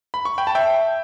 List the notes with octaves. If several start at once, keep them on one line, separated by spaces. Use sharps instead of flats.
B5
C#6
G5 B5
A5
E5 G5